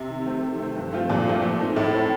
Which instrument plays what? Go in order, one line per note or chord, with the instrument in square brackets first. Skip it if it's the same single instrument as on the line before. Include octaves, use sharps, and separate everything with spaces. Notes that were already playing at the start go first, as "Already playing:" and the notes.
Already playing: [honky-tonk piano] C3
[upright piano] D#3
A3 C4
D#3
A3 C4
G2
F3 A3 C4 F4
[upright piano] G2 [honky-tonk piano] A#2
[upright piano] F3 A3 C4 F4
A3
C4 D#4 A4
[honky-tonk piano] A2 [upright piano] A3
[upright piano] C4 D#4 A4